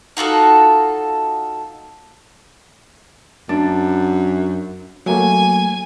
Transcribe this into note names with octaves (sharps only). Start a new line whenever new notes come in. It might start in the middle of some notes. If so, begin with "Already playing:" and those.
D#4 F4 F#4 A4
F#2 D4
F#3 A3 A#3 G#5